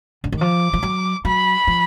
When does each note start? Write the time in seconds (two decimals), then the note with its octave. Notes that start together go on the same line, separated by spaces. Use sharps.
0.24 D3
0.32 D#3
0.41 F3 D6
0.73 F3
0.83 F#3
1.25 F#3 B5
1.67 F3